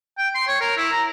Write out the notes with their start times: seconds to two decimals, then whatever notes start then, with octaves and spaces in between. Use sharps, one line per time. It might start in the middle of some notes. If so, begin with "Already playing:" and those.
0.18 G5
0.35 C6
0.48 C#5
0.61 A#4
0.77 E4
0.92 A#5